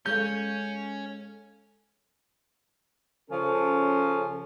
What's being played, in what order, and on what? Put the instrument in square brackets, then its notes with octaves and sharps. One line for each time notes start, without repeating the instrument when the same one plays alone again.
[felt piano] G#3 A4 F5 [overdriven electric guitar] C#4 [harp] G6
[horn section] C#3 F3 C#4 A4